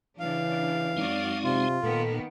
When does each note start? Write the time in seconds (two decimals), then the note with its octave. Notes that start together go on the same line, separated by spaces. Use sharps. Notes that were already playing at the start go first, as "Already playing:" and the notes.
0.20 C#3 E3 D4 F5
0.97 F#2 G#3 C4 D#4 F#4 D5
1.44 C3 F4
1.83 A#2 D#3 A#3 B3 A4